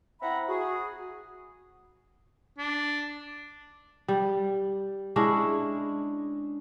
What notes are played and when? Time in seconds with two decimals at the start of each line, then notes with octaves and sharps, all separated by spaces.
0.22 C4 E4 E5 F#5 A#5 B5
0.48 F#4 G#4
2.58 D4
4.08 G3
5.16 G#3 C#4 D4 E4